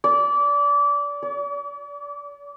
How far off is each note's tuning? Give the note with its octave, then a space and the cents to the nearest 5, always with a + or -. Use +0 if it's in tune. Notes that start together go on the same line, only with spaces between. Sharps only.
D5 -25
D5 -45